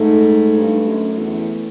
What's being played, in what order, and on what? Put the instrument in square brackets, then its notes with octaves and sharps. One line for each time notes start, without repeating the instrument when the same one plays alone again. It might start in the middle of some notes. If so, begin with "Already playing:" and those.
Already playing: [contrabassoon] G#2 [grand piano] A3
[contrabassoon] G2
F#2
E2